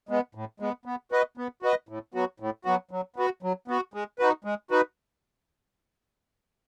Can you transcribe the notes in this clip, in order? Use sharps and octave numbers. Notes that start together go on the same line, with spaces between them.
G#3 B3
A2
G#3 B3
B3
F#4 B4 D#5
B3
F#4 B4 D#5
A2
F#3 B3 F#4
A2
F#3 B3 F#4
F#3
B3 F#4
F#3
B3 F#4
G#3
D#4 F#4 B4
G#3
D#4 F#4 B4